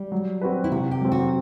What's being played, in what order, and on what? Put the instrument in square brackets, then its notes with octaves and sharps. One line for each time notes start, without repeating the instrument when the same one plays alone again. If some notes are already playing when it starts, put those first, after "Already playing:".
Already playing: [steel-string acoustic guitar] G3
[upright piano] F#3
C4 F#4 B4
[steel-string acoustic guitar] E4
[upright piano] C3 [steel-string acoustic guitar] F#4
[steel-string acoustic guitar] G4
[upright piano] F#3 C4
[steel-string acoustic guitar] F#4